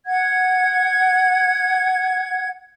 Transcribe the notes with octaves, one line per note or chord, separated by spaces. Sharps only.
F#5 G#6